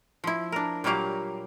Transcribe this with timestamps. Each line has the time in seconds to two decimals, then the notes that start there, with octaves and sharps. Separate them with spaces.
0.24 F3 E4
0.52 D4 A#4
0.84 A#2 F#3 G3 A#3 G4 F5